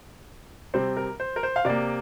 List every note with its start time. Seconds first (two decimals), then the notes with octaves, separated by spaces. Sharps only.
0.74 C3 G3 C4 C5
0.97 A#4
1.20 C5
1.36 A#4
1.43 C5
1.56 F5
1.65 C3 A#3 D5